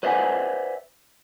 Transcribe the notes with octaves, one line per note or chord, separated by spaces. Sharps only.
B4 C5 D5 E5 F#5 G#5